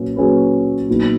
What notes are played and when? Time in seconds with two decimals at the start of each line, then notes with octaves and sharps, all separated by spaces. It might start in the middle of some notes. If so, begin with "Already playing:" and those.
Already playing: A#2 F#3 C#4 B4
0.16 A#2 F#3 C#4 G#4 B4
0.88 A#2 F#3 B3 D#4